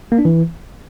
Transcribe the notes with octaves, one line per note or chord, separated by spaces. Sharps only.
A#3
D4
E3